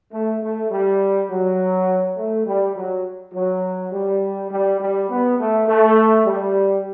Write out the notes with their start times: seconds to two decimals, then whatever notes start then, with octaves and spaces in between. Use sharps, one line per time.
0.13 A3
0.42 A3
0.71 G3
1.30 F#3
2.17 A3
2.46 G3
2.76 F#3
3.34 F#3
3.92 G3
4.50 G3
4.80 G3
5.09 B3
5.39 A3
5.68 A3
6.26 G3